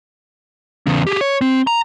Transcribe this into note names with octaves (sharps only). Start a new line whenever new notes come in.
E2 C#3
G4 G#4
C#5
C4
A#5